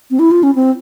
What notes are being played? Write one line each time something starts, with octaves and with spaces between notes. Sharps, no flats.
C4
E4
F4
C#4
C4